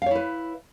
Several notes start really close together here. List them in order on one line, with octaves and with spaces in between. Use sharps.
F5 C#5 E4 B4